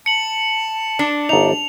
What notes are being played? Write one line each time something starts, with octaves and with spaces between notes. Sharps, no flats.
A5 C#7 F#7
D4
G1 D#4 F7